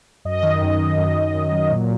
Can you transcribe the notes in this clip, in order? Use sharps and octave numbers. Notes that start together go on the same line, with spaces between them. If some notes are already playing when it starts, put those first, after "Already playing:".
F#2 D#5
D#3
F#2
F#2
F#2
F#2
F#2
F#3
A#2